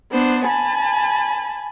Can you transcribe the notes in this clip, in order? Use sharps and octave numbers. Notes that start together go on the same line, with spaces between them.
B3 D4 C5
G#5 A5 B5